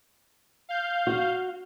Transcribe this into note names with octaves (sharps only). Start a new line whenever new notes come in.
F5 G6
F#4